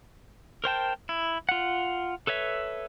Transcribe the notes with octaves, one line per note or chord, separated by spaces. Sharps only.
A#4 C5 G5 A5
E4
F4 F#5
A4 B4 C#5 E5